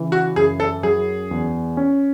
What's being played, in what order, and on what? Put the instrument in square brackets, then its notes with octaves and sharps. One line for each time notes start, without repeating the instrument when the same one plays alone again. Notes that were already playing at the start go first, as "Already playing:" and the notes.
Already playing: [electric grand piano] C#3 E3
[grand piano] F#4
[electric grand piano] F#2 [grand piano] G#4
[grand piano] A4
[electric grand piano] F#3 [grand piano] G#4
[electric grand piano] E2
C#4